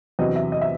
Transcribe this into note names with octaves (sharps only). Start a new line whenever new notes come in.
E2 C3 F#3 D#5
E5
D#5
E5